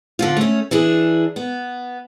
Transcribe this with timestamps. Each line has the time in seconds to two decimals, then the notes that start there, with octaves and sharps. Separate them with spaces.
0.19 D3 F3 F4
0.37 A3 C#4
0.71 E3 D4 G#4
1.36 B3